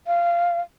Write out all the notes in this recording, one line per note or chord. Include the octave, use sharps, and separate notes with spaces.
F5